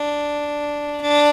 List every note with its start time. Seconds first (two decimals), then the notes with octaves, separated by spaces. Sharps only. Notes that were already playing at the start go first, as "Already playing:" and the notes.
Already playing: D4
1.01 D4